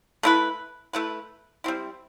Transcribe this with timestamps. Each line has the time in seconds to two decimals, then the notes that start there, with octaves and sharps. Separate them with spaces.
0.23 A3 E4 B4
0.93 A3 E4 B4
1.64 G3 C4 E4